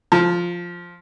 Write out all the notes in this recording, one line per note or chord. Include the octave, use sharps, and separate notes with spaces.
F3